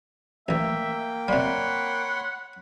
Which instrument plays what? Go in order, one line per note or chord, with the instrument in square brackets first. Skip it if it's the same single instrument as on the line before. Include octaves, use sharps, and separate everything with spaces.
[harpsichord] A1 E3 [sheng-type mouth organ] A#3 G5 [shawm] E5
[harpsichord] C3 G3 [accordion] C#5 B5 C6 [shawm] F#5